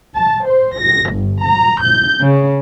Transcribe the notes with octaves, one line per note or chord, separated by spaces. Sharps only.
A5
C5
A#6
G1
A#5
G6
C#3